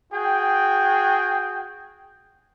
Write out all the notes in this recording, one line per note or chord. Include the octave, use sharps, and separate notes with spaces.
F#4 G#4 G5